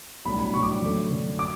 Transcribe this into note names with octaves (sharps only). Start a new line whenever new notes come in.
B1 A2 G3 D4 B5
B5
B1 A2 G3 D4 C#6
D6
F#2 D3 A3
F#2 D3 A3
D6